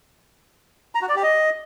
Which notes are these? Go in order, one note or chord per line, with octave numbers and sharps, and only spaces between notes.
A#5
F#4
D5
G4
D#5